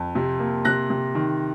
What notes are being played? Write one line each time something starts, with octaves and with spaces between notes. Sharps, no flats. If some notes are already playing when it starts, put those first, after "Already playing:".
Already playing: F2
C3
A#3
C3 F#6 A#6
C3
D#3